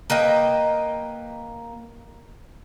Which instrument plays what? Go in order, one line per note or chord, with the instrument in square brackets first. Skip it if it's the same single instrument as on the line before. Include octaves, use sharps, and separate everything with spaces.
[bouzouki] A#3 B4 D#5 G5